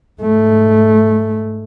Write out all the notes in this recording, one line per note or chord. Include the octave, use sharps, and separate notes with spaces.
G#2 A3